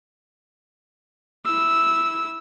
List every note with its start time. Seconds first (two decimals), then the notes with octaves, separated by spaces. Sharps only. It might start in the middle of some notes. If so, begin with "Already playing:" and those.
1.45 E4 E6